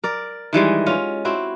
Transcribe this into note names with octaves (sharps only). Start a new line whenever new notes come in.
A#4 D5
D#3 E3 G3 G#3
C#4 F4
C4 E4 F#4